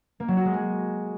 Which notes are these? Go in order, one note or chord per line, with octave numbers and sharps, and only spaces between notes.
A#3
F#3
F#4
G#3
G#4